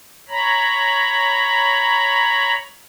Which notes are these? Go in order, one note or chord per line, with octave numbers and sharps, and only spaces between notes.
C#5 A#5 B5